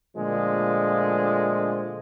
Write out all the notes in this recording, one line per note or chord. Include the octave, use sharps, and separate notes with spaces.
A#2 D3 F3 G#3 A3